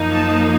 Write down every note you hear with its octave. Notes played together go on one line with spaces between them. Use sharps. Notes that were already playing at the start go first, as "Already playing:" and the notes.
Already playing: F#2 F3 A#3 D#4
A5